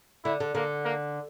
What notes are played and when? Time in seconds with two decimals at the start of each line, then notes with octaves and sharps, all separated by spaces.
0.24 D3 E4
0.40 D3
0.55 D3 A#3
0.85 A#3